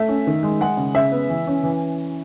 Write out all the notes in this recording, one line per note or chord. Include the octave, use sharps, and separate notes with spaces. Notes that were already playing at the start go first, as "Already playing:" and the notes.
Already playing: A3 E5
C#4
D#3
G#3
G#3 F#5
C#3
C#3 E5
B3
E3
C#4
E3